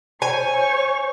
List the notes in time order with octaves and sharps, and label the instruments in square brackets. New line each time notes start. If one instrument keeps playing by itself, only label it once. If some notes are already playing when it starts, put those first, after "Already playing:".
[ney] C5 [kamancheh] C#5 C#6 [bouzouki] G#5